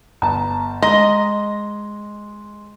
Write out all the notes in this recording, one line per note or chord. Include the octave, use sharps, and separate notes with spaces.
G1 A5 A#5
G#3 D#5 A#5 C6